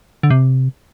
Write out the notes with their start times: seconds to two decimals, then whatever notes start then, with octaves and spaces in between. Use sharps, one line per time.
0.23 D3
0.30 C3